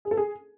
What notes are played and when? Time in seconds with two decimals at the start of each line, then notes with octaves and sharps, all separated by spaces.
0.05 G#4
0.11 A4
0.17 G#4